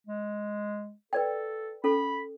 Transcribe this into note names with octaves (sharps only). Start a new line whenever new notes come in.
G#3
A4 B4 D5 G5
C#4 A4 B5